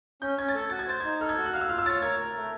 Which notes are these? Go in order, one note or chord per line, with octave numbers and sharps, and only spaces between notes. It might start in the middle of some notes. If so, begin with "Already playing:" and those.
C#4 G6
C#4 G#6
A6
A4 G#6
F#4 A6
G#6
C5 A6
G#6
D#4
A4 F6
G#6
F#4
F#6
F5 F6
E6
F4 F6
E6
C#5 A6
A#4 G#6
A#4
A3